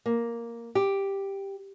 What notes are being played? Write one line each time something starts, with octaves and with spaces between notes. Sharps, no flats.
A#3
G4